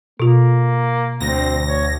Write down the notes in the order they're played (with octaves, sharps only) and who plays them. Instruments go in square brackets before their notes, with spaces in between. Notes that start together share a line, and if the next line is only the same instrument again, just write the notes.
[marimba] B2 F4 [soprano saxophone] A#3
[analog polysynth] D2 A#6 [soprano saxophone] C4
[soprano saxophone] C#5